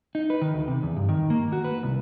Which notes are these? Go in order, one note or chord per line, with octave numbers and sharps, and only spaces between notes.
D#4
B4
D#3
D2
C3
E2
G2
D#3
A#3
F#4
B4
C2